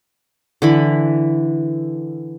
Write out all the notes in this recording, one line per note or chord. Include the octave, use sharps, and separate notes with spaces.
D3 E3 B5